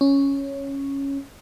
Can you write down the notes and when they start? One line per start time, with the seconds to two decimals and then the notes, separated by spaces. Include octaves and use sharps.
0.01 C#4